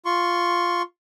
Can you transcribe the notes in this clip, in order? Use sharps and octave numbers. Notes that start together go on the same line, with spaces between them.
F4 C6 C#6